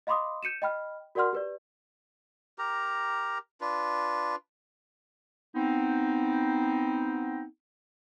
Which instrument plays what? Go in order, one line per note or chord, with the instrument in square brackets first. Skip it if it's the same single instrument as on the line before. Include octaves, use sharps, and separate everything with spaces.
[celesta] D#5 F5 B5 C6 D6 D#6
G6 C#7 D#7 E7
D#5 G5 B5 F6
F#4 A#4 D5 F#5 C6 F6
G4 B4 D5
[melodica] G4 A#4 A#5
D4 F4 B4
[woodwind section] B3 C4 D#4